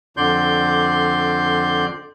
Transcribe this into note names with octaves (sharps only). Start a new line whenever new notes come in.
F2 D3 D5 C6 G6